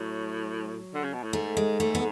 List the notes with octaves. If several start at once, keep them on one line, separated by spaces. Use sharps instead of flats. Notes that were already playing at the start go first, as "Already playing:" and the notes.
Already playing: A2 F#3
D3
C#3
B2
A2
G#2 A3
G#3
A3
B3